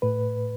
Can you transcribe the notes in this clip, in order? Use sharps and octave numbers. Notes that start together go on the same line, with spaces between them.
A2 B4